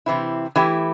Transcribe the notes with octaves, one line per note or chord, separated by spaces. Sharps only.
C3 E3 C4 E4
E3 A3 E4 G4